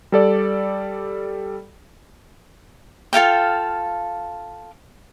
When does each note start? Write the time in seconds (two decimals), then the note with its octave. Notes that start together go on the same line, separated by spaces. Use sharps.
0.12 G3 A4 D5
3.13 F4 A4 F5 G5